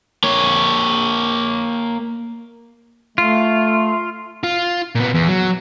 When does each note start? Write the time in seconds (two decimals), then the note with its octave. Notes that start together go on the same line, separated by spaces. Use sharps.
0.24 A#3 C#5
3.18 A3 F4
4.43 F4
4.95 A#2 B3
5.14 E2
5.28 F#3